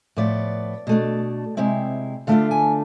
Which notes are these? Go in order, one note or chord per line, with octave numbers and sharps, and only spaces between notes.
A2 F3 B3 D5
B2 A3 D4
C3 G#3 C4 E4
D3 A3 D4 F4 F5
G#5